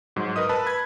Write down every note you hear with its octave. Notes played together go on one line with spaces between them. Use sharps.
G#2 F#3
A#4 B4 D#5 D#6
B4 A5 B5 E6
B5 G#6